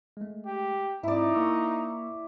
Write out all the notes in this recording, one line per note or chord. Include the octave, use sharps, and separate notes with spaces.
G#3 A3
G4
G#2 C4 D#4 E4 D5
A#3 C#6 E6